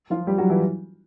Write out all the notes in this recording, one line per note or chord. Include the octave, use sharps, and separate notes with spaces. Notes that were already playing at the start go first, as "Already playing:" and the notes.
F3 F4
G3 G4
F#3 F#4
E3 E4